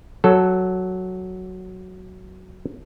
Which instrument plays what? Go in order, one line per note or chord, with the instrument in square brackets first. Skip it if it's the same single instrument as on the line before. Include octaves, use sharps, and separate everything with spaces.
[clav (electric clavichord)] F#3 A4